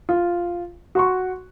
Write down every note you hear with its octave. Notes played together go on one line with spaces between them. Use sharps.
F4
F#4 C6 C#6